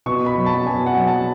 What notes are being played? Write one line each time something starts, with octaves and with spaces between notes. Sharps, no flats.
B2 C#6
B5
F#3
A5
B2 G#5
F#5
F#3
A5